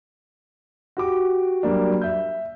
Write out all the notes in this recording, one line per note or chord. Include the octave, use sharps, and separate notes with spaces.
F#4 G4 D6
F#3 G3 A#3 D4
E5 G6